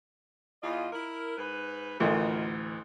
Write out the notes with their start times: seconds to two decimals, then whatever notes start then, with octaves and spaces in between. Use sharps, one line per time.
0.62 E2 F4 D#5
0.93 E4 A#4
1.37 G#2 B4
2.00 A1 D2 A#2 D#3